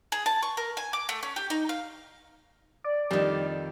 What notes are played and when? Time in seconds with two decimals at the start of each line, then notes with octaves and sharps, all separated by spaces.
0.12 G#4
0.26 A5
0.43 C#6
0.57 A#4
0.77 G#5
0.93 D6
1.09 A3
1.23 C#4
1.36 G4
1.50 D#4
1.69 F5
2.84 D5
3.11 F2 D#3 G3